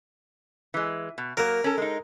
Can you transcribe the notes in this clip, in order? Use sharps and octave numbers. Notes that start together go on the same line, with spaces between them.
E3 G#3
B2
F#3 A#3 A#4
C#4 A4
G#3 D#4